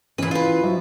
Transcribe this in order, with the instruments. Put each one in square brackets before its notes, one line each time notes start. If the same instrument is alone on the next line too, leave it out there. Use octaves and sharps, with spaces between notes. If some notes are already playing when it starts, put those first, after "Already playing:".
[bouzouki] A#2 B4 [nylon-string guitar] E3 C#4
[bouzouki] F4 B4
[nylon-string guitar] F3 F#3 E4